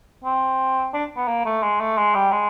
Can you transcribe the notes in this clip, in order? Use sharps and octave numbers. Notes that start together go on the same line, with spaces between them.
C4
D4
B3
A#3
A3
G#3
A3
G#3
G3
G#3